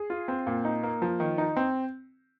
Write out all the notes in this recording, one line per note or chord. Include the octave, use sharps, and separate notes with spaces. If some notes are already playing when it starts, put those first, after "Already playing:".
Already playing: G#4
F4
C4
A#2
D#4
A#3
F3
D#3
D#4
C4